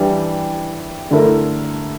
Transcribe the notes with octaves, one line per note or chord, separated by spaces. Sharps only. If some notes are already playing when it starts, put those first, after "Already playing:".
Already playing: E3 G3 D4 G4
D3 A3 E4 A#4